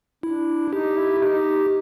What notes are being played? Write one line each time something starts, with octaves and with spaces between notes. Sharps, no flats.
D4 E4
D#4 G4
E4
D#4 G4